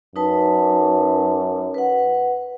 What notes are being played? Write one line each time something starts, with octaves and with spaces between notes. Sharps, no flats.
F#2 D#4 B4 A5
B4 F#5